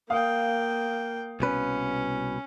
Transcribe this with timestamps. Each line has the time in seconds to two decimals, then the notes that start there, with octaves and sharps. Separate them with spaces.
0.10 A#3 F5 G5 D#6
1.40 C2 B2 C#4 B4